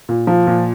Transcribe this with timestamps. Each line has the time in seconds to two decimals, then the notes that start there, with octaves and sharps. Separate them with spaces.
0.09 A#2
0.27 F3
0.47 A#2